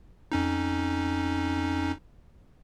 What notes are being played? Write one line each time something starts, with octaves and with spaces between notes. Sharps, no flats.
F2 C#4 D#4